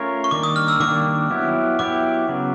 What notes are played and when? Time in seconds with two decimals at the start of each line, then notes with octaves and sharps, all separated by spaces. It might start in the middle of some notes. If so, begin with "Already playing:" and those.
Already playing: A3 C#4 F4 A#4 C#5
0.24 C#6
0.31 D#3 G3 A#3 D4 D6
0.43 D#6
0.56 F6
0.68 E6
0.80 D#3 G3 A#3 D4 D6
1.30 F#3 B3 E4 G4
1.79 F#3 B3 E4 G4 D6
2.28 C#3 F#3 B3